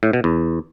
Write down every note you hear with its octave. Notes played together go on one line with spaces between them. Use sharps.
A2
B2
E2